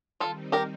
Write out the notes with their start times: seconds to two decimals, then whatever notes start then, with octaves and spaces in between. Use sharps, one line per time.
0.20 D#3 G3 C4 D#4 F4 A4
0.52 G4 A#4